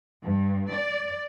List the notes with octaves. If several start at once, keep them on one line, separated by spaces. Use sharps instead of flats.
G2
D5